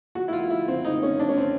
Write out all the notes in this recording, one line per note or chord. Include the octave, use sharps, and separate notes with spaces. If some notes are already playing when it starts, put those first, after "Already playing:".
F#4
E4
F4
E4
C4
D#4
C#4
D4
C#4
C4